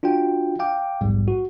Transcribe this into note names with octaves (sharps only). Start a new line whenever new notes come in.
D4 F4 F#4 G5
F5 G5 D6
A#1 E2 G#2 G3
F#4